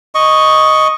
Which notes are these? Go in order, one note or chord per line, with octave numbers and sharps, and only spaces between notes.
D#5 C#6